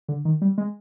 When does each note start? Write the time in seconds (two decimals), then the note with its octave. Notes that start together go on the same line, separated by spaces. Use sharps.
0.09 D3
0.25 D#3
0.42 G3
0.58 G#3